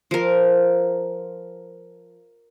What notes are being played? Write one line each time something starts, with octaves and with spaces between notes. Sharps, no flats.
F3 A#4